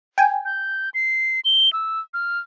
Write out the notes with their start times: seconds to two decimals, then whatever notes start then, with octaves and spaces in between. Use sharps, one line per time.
0.18 G5 G#5
0.45 G6
0.94 C7
1.45 G7
1.73 E6
2.14 F6